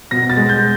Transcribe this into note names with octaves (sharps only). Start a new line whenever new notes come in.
B2 A#6
A6
G#3
G6